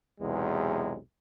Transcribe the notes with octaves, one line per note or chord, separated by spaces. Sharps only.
B1 E2 C3 G#3